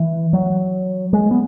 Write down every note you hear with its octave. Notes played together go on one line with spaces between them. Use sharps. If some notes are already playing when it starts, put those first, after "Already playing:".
Already playing: E3
F#3
G#3
B3